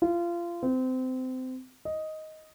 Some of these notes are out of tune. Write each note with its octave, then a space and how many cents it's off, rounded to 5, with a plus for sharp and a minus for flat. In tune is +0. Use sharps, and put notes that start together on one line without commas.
F4 -25
C4 -25
D#5 +5